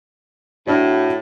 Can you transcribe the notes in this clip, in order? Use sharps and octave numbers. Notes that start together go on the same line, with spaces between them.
A2 D4 F#4 D5